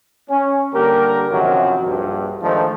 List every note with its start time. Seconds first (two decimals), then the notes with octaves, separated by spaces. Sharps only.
0.30 C#4
0.74 D3 G3 A#3 G4 A#4
1.30 F#2 C3 D#3 F3 F#3
1.85 A#1 G2
2.42 G#2 D#3 F3 A3 D4 D#4